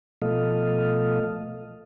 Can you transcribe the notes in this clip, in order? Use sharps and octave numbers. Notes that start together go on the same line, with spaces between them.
B2 F3 A3 A4 D#5 F5